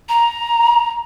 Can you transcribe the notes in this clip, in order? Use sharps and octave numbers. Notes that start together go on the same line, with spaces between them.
A#5